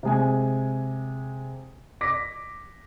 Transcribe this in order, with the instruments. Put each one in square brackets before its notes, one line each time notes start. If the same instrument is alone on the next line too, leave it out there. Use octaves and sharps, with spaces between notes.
[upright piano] C3 G#3 G#5
D6 A#6 B6